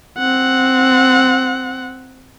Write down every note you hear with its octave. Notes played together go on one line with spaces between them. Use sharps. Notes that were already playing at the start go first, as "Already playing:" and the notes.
C4 F#5